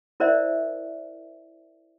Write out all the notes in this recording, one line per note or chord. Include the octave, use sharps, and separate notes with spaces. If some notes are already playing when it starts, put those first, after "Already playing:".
E4 A#4 C5 D5 E5